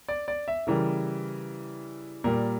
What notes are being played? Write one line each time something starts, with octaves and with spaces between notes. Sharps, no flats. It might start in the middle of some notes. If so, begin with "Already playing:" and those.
D5
D5
E5
C#3 E3 G3 A#4
A#2 G3 A#4